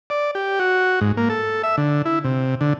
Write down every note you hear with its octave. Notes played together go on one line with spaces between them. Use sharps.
D5
G4
F#4
G#2
A#3
A4
E5
D3
E4
C3
D3